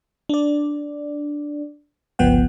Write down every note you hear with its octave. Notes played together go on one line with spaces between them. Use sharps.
D4 D5
G1 C#2 F3 B3 F#5 G5